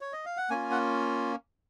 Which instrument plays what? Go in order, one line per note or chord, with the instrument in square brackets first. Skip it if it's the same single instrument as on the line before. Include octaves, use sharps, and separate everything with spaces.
[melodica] C#5
D#5
F5
F#5
A#3 C#4 F4 G#5
F#5